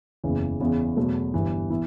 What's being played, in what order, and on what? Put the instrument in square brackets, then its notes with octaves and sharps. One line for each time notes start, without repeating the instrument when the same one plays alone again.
[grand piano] F#1 E2 C#3 E3
E2 C#3 E3 B3
E2 B2 F#3 A3
G1 G2 E3
E3 B3 E4